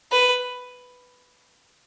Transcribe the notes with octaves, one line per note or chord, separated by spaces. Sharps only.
B4